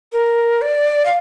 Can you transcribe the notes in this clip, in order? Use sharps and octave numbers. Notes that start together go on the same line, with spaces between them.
A#4
D5
F5